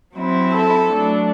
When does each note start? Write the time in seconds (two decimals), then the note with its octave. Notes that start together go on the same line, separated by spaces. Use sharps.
0.15 F#3 C4 E4
0.51 A4
0.88 F#3 A3 D4